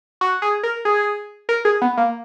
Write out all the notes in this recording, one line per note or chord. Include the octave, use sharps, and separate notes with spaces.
F#4
G#4
A#4
G#4
A#4
G#4
B3
A#3